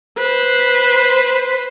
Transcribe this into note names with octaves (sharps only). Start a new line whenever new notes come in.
B4 C5